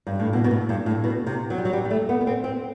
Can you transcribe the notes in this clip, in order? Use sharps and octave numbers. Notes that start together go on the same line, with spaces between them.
G2
A2
B2
B2
A2
G2
A2
B2
C3
F#3
G3
F#3
G3
G3
A3
B3
B3
C4
C4